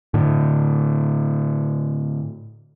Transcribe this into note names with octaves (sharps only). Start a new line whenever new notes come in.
A2 D3